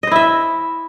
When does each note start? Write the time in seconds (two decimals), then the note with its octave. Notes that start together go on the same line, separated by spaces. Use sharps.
0.03 D#5
0.07 C5
0.11 E4
0.16 E5